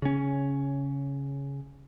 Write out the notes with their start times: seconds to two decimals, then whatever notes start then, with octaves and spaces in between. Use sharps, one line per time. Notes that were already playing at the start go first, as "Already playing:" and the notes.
0.02 C#3 C#4